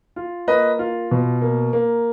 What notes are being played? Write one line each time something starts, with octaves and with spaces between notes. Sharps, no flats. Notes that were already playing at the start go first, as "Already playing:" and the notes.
F4
A#3 B4 D#5
F4
B2
A#3
A#3